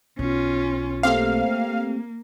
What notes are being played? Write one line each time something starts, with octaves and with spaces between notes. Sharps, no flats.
B1 C#4 F4
A3 A#3 C4 G4 F5